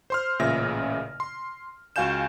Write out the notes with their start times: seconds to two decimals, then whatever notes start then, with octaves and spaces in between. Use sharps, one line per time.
0.10 C5 C6 F6
0.39 A1 A#2 C#3 E5 A#6
1.20 C6
1.96 C#2 F#4 F5 G#5 G6 E7